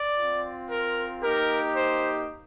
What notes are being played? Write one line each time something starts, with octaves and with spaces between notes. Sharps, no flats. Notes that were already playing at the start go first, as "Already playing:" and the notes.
Already playing: D5
C4 F4
A#4
A#3 D#4 G4 A#4
C5